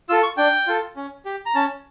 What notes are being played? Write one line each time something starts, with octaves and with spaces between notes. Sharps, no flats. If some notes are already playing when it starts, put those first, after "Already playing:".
F4 A4 E6
C#6
D4 G5
F4 A4
C#4
G4
A#5
C#4 A5